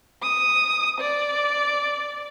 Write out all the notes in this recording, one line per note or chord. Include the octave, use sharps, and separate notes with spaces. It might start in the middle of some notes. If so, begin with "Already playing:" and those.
D#6
D5